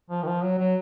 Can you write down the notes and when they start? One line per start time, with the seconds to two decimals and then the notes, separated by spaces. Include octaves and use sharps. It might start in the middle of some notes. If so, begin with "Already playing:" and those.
0.10 F3
0.23 D#3
0.27 F3
0.42 F#3
0.58 F#3